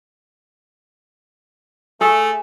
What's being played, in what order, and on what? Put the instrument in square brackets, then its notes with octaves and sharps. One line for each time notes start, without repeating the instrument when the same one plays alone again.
[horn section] A3 [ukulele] G#4